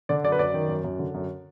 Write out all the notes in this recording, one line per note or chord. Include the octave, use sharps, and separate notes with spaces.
D3 D5
F#2 D5
B4
F#2 D5
D#3
F#2
F#2
D3
F#2